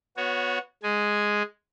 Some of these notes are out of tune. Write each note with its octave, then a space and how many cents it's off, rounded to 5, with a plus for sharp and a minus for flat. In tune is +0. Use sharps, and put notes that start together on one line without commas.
B3 +0 F#4 -20 C#5 +5
G#3 +0 G#5 +0